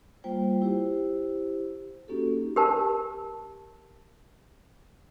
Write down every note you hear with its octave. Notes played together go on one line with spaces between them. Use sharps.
G3 A#3 F4 C5 G5
E4 G4 C5
A#3 C#4 D#4 F#4 G4 A4
G4 A#4 A5